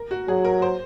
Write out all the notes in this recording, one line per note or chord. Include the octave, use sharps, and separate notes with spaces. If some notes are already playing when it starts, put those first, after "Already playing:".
Already playing: A#4
F#4
F#3 G#4
A#4
C5